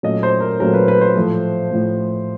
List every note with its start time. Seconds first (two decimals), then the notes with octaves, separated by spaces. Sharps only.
0.03 A#2 F#3 A3 C#4 D#5
0.23 C5
0.40 A#4
0.60 A#2 F#3 A3 C#4 A#4
0.74 B4
0.88 B4
1.01 C5
1.16 A2 F3 A3
1.71 A2 F3 A3